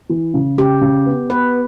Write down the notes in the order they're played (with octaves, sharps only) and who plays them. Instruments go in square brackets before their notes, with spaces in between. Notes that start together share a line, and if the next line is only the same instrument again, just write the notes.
[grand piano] E3
C#3
[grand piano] C#3 [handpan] G4
[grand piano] C#3
B3
[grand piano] B3 [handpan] B4